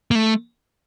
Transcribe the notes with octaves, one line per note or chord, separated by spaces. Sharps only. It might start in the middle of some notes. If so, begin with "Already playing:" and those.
A#3
A3